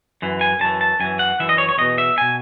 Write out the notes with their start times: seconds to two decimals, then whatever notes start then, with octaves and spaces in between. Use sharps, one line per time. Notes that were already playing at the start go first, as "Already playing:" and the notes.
0.22 F#2 E3
0.41 G#5
0.60 F#2 E3 A5
0.81 A5
1.00 F#2 E3 G#5
1.19 F#5
1.39 F#2 E3 E5
1.49 D#5
1.58 C#5
1.69 C#5
1.78 E2 B2 D#5
1.98 E5
2.18 B2 G#5